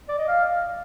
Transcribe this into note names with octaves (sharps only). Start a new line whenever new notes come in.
D5
D#5
F5